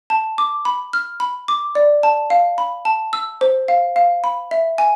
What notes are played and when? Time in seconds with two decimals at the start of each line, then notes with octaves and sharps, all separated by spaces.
0.10 A5
0.38 D6
0.65 B5
0.93 F6
1.20 B5
1.48 D6
1.75 D5
2.03 A5
2.30 F5
2.58 B5
2.85 A5
3.13 E6
3.41 C5
3.68 F5
3.96 F5
4.24 B5
4.51 E5
4.78 G#5